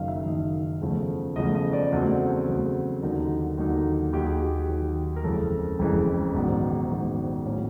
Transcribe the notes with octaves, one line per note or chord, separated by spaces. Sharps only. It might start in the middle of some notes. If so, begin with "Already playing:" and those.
Already playing: F#1 F#2 D#3 F5
E5
F#1 F#2 D#3 D#5
E2 C#3 F3 A3
E2 C#3 F3 A3 D#5
D#5
D5
E2 C#3 F#3 A3 C4 C5
E2 C#3 F#3 A3 C4
D#2 D3 F#3 A#3 D#4 A#4
D#2 D3 F#3 A#3 D#4
D#2 D#3 F#3 G4
G#4
G4
D#2 D#3 F#3
A#4
F#1 F2 C#3 E3 G#3 A4
F#1 F2 C#3 E3 G#3
A#1 G#2 D#3 F#3 B3
A#1 G#2 D#3 F#3 B3
A2 F#3 A#3 C#4